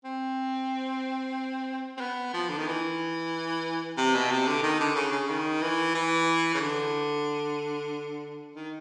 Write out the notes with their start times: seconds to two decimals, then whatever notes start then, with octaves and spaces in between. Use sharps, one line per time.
0.04 C4
1.97 C4
2.01 B3
2.34 F3
2.50 D3
2.58 D#3
2.67 E3
3.97 C3
4.15 B2
4.31 C3
4.47 D3
4.63 D#3
4.80 D3
4.96 C#3
5.12 C#3
5.29 D#3
5.62 E3
5.95 E3
6.55 C#3
6.60 D3
8.56 D#3